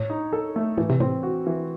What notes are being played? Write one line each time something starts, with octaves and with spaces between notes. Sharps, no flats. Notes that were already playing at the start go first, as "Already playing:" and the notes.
Already playing: A2 C#5
D#4
A4
A3
A2 E3
C3
A2 C4
F#4
E3